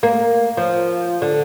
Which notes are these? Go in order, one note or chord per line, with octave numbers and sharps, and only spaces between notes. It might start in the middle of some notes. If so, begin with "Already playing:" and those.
A#3
F3
D3